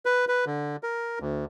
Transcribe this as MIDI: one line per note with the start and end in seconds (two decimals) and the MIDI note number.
0.05 0.25 71
0.28 0.45 71
0.46 0.76 50
0.83 1.19 70
1.20 1.45 38